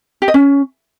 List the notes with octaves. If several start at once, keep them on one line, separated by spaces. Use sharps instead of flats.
G4
D#5
C#4